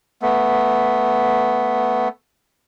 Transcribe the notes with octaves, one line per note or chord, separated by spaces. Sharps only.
A3 B3